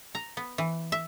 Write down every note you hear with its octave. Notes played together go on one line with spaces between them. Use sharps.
A#5
B3
E3
E5